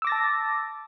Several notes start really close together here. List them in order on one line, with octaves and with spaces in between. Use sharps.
E6 D6 A#6 A6 A5